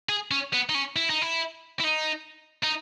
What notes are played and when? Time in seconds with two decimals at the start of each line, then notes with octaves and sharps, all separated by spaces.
0.09 G#4
0.31 C#4
0.53 B3
0.69 D#4
0.75 C#4
0.96 E4
1.10 D#4
1.22 E4
1.80 E4
1.84 D#4
2.64 D#4